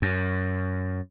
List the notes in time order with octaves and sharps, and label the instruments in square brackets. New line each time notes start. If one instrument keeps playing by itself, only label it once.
[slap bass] F#2